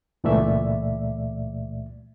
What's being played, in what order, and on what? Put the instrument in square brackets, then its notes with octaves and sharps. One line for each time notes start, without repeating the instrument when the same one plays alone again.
[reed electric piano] C#2 A#2 E3 A3 D5 E5